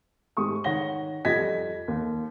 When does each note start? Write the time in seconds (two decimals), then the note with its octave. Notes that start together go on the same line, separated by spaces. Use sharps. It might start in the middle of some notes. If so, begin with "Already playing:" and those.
0.37 G#2 G4 C#6 D#6
0.64 D#3 C#5 F#5 A#6 G7
1.25 F2 G3 D#5 G#6 A#6 B6
1.88 D#2